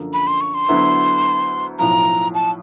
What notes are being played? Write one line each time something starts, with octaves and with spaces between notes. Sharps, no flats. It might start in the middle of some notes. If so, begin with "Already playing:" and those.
Already playing: F#2 D3 F3 A#3
B5
C6
C#6
C6
D2 D3 F#3 B3 E4
B1 A2 F3 A#5
A5